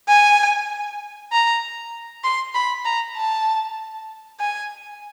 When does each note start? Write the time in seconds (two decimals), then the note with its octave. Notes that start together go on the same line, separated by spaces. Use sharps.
0.08 G#5
1.32 A#5
2.24 C6
2.54 B5
2.85 A#5
3.17 A5
4.40 G#5